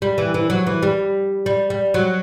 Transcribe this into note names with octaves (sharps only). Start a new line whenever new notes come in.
G3
E3
E3
F#3
E3
G3
G3
G3
F#3